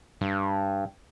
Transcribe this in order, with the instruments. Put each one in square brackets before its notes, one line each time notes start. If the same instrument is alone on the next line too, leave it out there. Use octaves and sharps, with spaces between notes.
[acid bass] G2